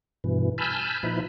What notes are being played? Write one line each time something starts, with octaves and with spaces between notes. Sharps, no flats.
G2 B2 E3
G#5 A5 B5 E6 F6 G6
A#2 F3 D#4 E4 B4 B5